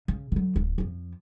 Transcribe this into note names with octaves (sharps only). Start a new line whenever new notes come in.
C#3
D3 F#3
D1
F2 F3